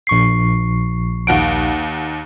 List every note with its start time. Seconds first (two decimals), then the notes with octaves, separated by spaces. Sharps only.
0.07 A#1 C#6 C7
1.27 D#2 F#5 D7